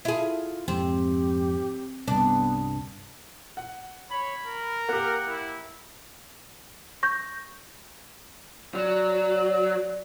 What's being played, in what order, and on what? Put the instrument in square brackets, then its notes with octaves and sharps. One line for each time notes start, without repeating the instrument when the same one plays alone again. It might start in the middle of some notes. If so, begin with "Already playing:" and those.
[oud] E4 G#4 [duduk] F4
[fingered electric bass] F2 G#2 [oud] C4 [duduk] G4
[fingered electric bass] C2 G2 [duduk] B3 [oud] D4
[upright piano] F#5
[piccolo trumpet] C#5 [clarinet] B5
[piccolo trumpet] A#4
[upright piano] A#3 G4 [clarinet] F#5
[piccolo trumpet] E4
[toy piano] C#6 [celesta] G6 A#6
[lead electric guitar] F#3 [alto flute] D5